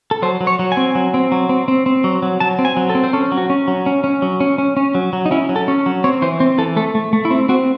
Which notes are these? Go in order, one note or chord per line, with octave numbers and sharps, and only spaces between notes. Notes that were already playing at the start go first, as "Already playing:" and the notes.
A4
F#3 C5
F#3
C#5
F#3
G#5
C4
F#3
C4
F#3
C4
C4
C4
F#3
F#3
F#3 A5
C4
G#5
F#3
A4
C4
C5
C#4 A4
F#3
F#4
C#4
F#3
C#4
C#4
F#3
C#4
C#4
C#4
F#3
F#3
D#4
C#4 E4
F#3
A4
C#4
F#3
C4 C#5
E3 C5
C4 C5
E3 A4
A3 A4
A3
A3
E4
C4
C4 F#4